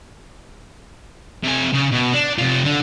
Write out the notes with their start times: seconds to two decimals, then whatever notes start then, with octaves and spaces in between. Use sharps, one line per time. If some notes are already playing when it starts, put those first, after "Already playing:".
1.44 C3 G#5
1.74 C#3
1.92 B2
2.14 D4
2.38 C3 F4
2.65 D3